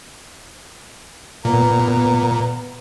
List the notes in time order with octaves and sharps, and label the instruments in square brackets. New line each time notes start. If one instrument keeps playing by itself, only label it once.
[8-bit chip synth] A#2 [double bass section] B3 [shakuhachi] A#5